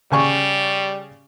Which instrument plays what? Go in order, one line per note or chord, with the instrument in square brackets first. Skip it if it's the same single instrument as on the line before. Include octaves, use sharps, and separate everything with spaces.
[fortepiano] C#3 G#5 C#6 [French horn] G3